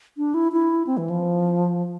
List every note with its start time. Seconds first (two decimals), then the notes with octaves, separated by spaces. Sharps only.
0.17 D4
0.34 E4
0.52 E4
0.87 C4
0.97 E3
1.10 F3